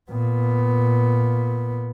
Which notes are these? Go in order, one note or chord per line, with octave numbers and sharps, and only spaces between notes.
A#2 B3